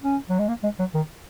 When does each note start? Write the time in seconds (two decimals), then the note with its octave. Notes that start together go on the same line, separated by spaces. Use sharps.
0.03 C#4
0.30 F#3
0.39 G#3
0.48 A#3
0.64 G#3
0.79 F#3
0.94 D#3